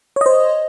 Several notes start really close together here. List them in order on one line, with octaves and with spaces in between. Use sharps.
C#5 D#5 C5